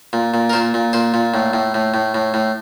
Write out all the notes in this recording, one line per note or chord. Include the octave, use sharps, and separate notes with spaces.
A#2
A#2
A#4
A#2 C5
A#2
A#2 C5
A#2
A2
A2
A2
A2
A2
A2